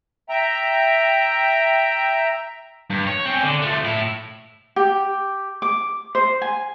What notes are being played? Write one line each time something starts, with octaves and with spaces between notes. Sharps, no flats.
E5 G5 A#5
G2
C#5
C4 C#4
D3
F3 A3
A2 E4
G4
D6
C5
G#5